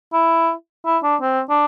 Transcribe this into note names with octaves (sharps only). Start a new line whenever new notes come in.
E4
E4
D4
C4
D4